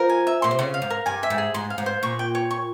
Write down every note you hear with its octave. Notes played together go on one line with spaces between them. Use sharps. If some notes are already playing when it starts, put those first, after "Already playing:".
Already playing: F3 A#4
G#5
E5
A#2 C6
C3
C#3 C6
F5
G#2
A#4
G2 G#5
E5
G#2
G#4
G#2 C6
F5
G#2
C5
A#2 C#6
G5
C#5
C#6